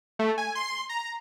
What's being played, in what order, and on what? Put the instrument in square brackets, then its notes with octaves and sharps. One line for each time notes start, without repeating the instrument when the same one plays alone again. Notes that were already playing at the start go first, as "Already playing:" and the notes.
[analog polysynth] A3
G#5
C6
A#5